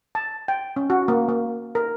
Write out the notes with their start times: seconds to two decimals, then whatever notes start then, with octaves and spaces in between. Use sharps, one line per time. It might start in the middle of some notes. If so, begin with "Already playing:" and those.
0.15 A5
0.48 G5
0.76 C#4
0.90 F#4
1.08 A#3
1.29 A#3
1.75 A#4